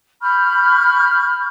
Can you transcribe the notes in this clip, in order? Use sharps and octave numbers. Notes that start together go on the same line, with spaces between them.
B5 C#6 F6 G6